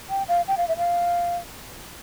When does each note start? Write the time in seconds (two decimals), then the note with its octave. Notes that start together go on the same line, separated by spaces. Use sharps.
0.10 G5
0.28 F5
0.48 G5
0.58 F5
0.68 E5
0.77 F5